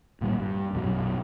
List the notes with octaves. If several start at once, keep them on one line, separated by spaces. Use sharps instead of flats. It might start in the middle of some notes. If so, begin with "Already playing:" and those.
D1 A#2 G3
G2
A#1 F#2 B2 F#3